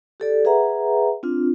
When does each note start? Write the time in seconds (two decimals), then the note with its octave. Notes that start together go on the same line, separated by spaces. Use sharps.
0.20 G4 A4 D5
0.45 G#4 B4 E5 F#5 A#5
1.23 C4 D4 F4